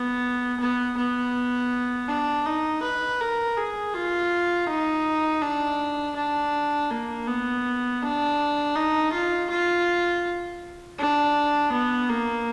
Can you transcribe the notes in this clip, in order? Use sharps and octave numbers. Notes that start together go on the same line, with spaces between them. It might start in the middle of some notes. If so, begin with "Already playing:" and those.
Already playing: B3
B3
B3
D4
D#4
B4
A#4
G#4
F4
D#4
D4
D4
A#3
B3
D4
D#4
F4
F4
D4
B3
A#3